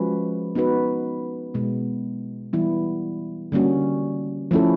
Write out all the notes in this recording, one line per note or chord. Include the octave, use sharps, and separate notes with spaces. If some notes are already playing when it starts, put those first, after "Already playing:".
Already playing: F3 G#3 C#4 F#4 B4
B3 D#4 F#4 B4
B2 G#3 B3
E3 G3 B3 E4
D3 G3 A#3 C#4 F#4
F3 A3 C#4 E4 A4